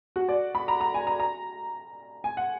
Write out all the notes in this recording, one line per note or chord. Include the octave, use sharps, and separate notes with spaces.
F#4
D5
B5
A#5
A#5
G#5
A#5
A#5
G#5
F#5